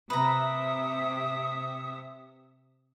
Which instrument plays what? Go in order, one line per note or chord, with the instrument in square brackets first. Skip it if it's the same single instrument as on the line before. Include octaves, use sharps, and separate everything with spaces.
[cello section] C3 E5 [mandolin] B4 A#5 [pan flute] D#6